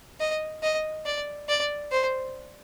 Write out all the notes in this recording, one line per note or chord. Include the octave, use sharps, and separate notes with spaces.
D#5
D#5
D5
D5
C5